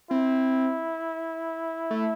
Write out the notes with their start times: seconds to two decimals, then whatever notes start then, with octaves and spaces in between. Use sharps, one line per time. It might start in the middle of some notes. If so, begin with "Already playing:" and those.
0.10 C4 E4
1.91 A3